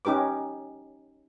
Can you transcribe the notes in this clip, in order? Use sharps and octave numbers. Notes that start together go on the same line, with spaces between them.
C#4 D#4 G4 B4 D6